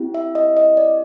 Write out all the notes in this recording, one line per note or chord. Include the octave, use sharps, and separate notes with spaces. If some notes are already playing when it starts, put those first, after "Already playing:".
Already playing: C4 E4 G4
E5
D#5
D#5
D5